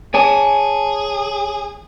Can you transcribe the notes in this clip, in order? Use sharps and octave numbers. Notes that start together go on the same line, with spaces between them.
G#4 C#5 G#5 A5